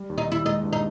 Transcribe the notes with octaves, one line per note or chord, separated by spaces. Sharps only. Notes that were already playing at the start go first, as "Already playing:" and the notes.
Already playing: G3
D#2
D#4
D#2 E4
G#3 D#4
G2
D#4